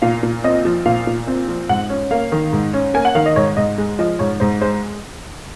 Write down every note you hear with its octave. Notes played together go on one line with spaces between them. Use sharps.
A#2 F5
A#2
C4 D#5
F3
A#2 F5
A#2
C4
F3
G#2 F#5
C#4
A#3 F5
D#3
G#2
C#4
A#3 G#5
F#5
D#3 F5
D#5
G#2 C#5
G#2 D#5
G#3
F3 D#5
G#2 C#5
G#2 C5
G#3 C5